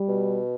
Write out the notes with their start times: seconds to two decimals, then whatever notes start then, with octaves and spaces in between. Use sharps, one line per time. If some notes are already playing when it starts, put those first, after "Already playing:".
Already playing: G3
0.08 B2